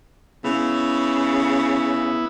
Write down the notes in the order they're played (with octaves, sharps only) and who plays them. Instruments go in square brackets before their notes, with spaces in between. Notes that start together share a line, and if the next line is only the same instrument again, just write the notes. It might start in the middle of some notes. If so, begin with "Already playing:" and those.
[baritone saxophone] C#3 [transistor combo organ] B3 E4